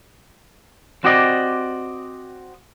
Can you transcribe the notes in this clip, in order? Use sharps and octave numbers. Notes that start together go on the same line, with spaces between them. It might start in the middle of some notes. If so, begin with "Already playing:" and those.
C4 F#4 G4 D5 D#5